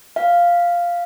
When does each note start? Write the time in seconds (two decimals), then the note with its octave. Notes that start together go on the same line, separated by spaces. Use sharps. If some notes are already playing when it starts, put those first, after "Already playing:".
0.16 F5